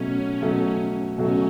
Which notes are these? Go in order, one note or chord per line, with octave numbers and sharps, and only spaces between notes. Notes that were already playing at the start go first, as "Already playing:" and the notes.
Already playing: B2 F#3 A3 C#4
B2 F#3 A3
B2 F#3 A3 C#4